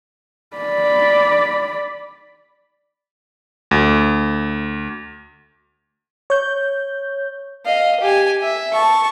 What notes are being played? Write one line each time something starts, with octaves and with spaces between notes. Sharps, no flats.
D5 B5
D2
C#5 G6
D#5 F5
G4 G#5
E5
A5 C#6